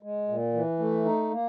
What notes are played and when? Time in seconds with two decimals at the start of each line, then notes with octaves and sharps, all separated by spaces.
0.03 G#3
0.28 A#2
0.54 E3
0.79 A3
1.05 D#4
1.31 A#3